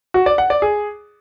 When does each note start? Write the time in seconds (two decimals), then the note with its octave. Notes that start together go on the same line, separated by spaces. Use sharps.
0.14 F#4
0.26 D5
0.38 F#5
0.50 D5
0.62 G#4